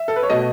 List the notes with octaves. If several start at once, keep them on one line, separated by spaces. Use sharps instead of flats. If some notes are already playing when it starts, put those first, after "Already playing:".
Already playing: E5
A4
B4
C#5
B2 A3 D#5